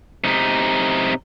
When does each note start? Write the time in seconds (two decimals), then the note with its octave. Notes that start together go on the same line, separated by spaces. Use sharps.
0.24 C3 D#4